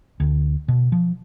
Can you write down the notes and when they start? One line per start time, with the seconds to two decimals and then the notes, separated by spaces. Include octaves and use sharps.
0.20 D2
0.68 B2
0.92 F3